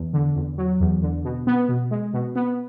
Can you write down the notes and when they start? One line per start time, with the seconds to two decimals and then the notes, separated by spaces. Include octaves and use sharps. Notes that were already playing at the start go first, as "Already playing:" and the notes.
Already playing: E2
0.13 D3
0.36 E2
0.58 F#3
0.80 E2
1.02 D3
1.25 B2
1.47 B3
1.69 B2
1.91 G#3
2.14 B2
2.36 B3